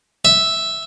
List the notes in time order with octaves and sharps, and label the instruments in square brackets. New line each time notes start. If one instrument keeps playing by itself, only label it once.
[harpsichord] E5